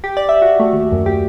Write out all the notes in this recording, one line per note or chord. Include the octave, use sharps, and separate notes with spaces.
G4
D5
E5
F#4
A3
D#2
F#2
G4